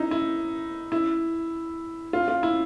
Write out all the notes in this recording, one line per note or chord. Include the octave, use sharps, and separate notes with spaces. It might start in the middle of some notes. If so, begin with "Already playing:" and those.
Already playing: D#4 E4
E4
E4
F4
F4
E4